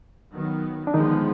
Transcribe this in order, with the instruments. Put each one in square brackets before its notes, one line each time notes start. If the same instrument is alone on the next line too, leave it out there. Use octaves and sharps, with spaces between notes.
[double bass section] D#3 F#3 B3
[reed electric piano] D4
[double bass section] D3 F3 G#3 B3 [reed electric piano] D#3 D#4